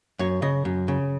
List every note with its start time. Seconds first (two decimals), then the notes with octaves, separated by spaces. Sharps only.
0.19 F#2 C#5
0.42 C#3 D#5
0.65 F#2
0.88 C#3